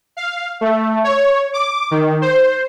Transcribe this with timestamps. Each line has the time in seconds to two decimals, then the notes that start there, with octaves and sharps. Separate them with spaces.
0.17 F5
0.61 A3
1.04 C#5
1.53 D6
1.91 D#3
2.22 C5